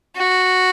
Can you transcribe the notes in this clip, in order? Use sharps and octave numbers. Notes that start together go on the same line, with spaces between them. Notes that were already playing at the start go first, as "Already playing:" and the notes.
F#4